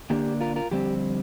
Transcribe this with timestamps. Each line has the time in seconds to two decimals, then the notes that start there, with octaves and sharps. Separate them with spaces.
0.10 D3 A#3 D4 G4
0.41 F4 A#4
0.56 F4 A#4
0.71 F2 D3 G3 C4 G4